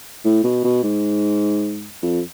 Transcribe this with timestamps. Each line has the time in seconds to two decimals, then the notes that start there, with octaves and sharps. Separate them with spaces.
0.25 A2
0.44 B2
0.64 B2
0.83 G#2
2.03 F2